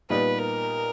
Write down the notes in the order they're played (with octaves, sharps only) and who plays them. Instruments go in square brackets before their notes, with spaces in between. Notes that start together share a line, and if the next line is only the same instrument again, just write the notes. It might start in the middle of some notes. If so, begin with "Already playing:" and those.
[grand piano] A#2 G3 B3 D#4 [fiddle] B4
[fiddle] A#4